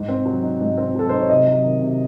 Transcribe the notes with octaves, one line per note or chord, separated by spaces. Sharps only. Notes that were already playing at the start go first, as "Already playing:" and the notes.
Already playing: G#2
C4
F#3
D#4
G#2
C4
F#3 A4
D#4 C5
C#5
C3 D#5
F#3
D#3
C3